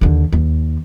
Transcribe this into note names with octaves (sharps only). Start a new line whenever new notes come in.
D#2 D3
D#2